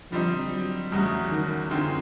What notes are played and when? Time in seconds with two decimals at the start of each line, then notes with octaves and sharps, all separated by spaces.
0.11 D3 F3 G3 C4 D#4
0.52 F#3
0.91 E2 C#3 F#3 G3 A3
1.31 D#3
1.71 F#2 D3 D#3 G#3 C4 F4